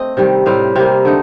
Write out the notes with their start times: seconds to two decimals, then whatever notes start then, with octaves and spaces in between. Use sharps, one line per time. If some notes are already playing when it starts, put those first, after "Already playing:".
Already playing: A3 C4 D#5
0.17 C3 D#3 G3
0.46 A2 G3 C4 F5
0.76 C3 G3 A#3 F5
1.05 D3 A3 D#4